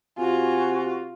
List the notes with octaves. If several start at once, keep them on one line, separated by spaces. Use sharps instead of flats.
C3 F4 F#4 G#5